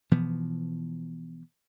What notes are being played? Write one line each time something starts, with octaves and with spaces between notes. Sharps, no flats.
B2 E3 F3 B3